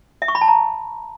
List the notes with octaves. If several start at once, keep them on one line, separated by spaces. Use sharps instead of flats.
E5
C#6
B5
A5
A#5